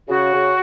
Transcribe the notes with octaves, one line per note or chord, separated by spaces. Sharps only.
C#3 F#4
C#3